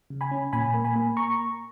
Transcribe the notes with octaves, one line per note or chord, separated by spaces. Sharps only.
C#3
G#5 B5
C#4
A#2 G#5 B5
A#3
G#5 B5
A#3
A#5 C#6